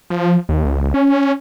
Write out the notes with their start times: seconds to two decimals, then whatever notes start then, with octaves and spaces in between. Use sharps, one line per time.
0.10 F3
0.49 D#2
0.65 C#2
0.94 C#4